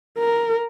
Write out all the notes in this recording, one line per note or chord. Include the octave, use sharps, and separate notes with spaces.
A#4